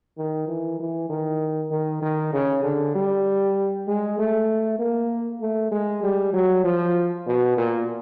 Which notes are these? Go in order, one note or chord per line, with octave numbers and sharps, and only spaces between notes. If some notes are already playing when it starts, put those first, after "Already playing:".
D#3
E3
E3
D#3
D#3
D#3
C#3
D3
G3
G#3
A3
A#3
A3
G#3
G3
F#3
F3
B2
A#2